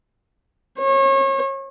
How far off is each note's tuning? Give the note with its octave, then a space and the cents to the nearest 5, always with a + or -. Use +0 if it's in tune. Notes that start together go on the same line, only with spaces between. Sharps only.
C#5 -35